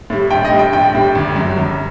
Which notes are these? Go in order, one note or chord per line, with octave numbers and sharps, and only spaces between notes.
A2 G3
A#1 G5
D#5
A2 G3
G5
A#1 G5
A2 G3
G1
F#2 F#3
G1